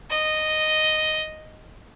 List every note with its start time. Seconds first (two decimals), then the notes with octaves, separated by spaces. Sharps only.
0.10 D#5